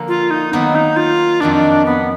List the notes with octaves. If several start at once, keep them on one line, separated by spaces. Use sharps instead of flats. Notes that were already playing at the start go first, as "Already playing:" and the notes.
Already playing: D3 F3 A#3
F4
D#4
D#3 F#3 A#3 B3
D#4
F4
F2 D#3 F#3 D4
B3